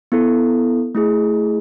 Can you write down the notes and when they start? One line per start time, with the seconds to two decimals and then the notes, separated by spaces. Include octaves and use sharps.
0.12 B3 E4 A4
0.95 A3 E4 G#4